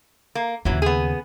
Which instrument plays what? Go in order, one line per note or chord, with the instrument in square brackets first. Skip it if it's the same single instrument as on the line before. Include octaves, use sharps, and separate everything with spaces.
[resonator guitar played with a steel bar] A#3
[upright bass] D#2 C#3 [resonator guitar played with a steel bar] E3 F#3
[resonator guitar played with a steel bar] B3 G#4